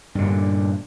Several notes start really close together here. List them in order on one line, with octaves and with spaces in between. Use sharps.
G2 D3 A#2